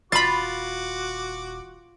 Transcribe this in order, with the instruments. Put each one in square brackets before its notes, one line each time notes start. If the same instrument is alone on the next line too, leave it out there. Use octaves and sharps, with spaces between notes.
[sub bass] D#1 [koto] F4 F5 [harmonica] F#4 D6 [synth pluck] B5 A6